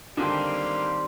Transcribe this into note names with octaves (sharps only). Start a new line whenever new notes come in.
D3 D#3 G3 A#3 C4 G4 F5